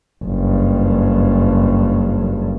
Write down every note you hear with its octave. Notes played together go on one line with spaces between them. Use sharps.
F#1 G2